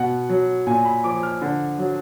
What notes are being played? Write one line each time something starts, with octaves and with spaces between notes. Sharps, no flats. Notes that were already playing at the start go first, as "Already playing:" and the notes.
Already playing: B2 F#5
F#3
A#2 G#5
B5
F3 D6
F6
D3
F#3